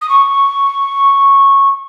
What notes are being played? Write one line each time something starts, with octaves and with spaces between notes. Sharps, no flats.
D#6
C#6